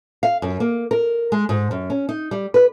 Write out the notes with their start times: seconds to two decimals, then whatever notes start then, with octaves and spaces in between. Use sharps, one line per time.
0.23 F5
0.42 F#2
0.60 A#3
0.91 A#4
1.32 G#3
1.49 G#2
1.71 F#2
1.90 C#4
2.09 D#4
2.31 G3
2.54 B4